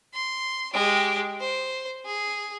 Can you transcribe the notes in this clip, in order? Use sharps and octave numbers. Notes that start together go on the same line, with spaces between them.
C6
G#3 G4
C5
G#4